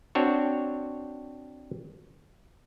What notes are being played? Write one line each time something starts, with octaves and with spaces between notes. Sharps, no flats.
C4 D4 F#4 C#5